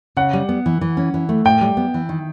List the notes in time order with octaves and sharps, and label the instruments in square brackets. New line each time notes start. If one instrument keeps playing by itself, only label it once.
[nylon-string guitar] C#3 [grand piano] F#5
[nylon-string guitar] G3
B3
E3
E3
C#4
E3
A3
[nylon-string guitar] A2 [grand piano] G5
[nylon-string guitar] G3
B3
E3
D#3